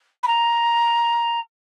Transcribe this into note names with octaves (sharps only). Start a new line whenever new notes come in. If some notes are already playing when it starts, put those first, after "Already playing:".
B5
A#5